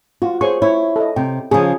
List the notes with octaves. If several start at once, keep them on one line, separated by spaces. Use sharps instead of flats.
F4 F#4
G#4 C5 C#5 C#6
E4 C#5
A4 D#5
C3 G5
C#3 F3 G#4